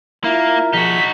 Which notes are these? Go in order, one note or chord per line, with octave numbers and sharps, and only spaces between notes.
A#3 E4 F4 A#4
B1 F3 D#4 F#4 G#4 B6